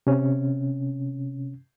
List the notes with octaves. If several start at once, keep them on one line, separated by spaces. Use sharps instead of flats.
C3 C#4